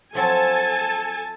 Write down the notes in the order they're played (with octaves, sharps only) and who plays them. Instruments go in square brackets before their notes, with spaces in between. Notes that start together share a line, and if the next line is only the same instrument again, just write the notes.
[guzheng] F3 F#3 C4 [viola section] A4 G#5 A5